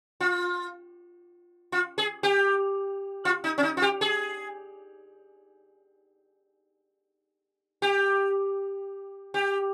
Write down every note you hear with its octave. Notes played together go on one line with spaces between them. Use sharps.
F4
F4
G#4
G4
F4
D#4
C#4
D#4
F4
G4
G#4
G4
G4